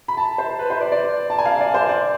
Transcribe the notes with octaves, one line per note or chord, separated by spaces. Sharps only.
B5
A5
C5
B4
C5
D5
D5
A5
G#5
F5
D5
C5
D5